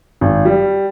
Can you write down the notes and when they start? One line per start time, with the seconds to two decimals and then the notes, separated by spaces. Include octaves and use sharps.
0.21 G#1
0.45 G3